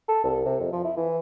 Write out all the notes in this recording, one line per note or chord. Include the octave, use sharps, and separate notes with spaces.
A4
C2
C3
F2
F3
E4
E3